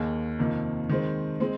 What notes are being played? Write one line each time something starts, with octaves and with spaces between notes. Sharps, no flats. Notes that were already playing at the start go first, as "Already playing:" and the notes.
Already playing: D#2 D#3 A#3 G#4
F2 C3 D#3 A#3
D#3 G#3 C4
G#3 C4